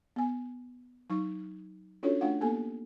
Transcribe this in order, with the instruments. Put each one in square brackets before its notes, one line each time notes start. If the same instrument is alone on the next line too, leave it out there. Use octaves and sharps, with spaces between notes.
[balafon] B3 G#5
F#3 D#4 C#6
C#4 D4 F4 F#4 A4 C#5
A3 D4 F4 F5 F#5
A#3 B3 G4 A4 G#5